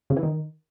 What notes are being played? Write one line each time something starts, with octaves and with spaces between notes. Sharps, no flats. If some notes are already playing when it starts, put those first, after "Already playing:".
C#3
E3
D#3